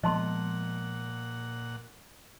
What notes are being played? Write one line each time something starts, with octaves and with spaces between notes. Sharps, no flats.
A#2 F3 G#3 B3 D#5 F#5 A5 C6